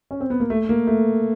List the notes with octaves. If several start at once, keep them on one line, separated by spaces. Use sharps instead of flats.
C#4
C4
B3
A#3
A3
A#3
A3